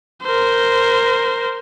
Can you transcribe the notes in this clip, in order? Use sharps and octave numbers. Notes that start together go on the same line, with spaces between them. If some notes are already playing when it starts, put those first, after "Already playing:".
A#4 C5